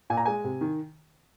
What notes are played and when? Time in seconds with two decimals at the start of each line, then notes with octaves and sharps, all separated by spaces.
0.10 A#2 G#5
0.17 A#5
0.26 G#3 G#5
0.44 C3
0.61 D#3